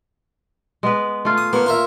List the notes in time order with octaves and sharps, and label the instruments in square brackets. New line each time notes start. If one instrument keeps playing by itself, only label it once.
[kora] G#3 B3 B4
A3 F4
[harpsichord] D#6
[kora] A#3 C#5 [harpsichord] B3
[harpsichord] F4 A#4 E5